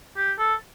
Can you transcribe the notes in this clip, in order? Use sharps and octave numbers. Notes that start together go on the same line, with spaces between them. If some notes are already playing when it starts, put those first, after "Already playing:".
G4
A4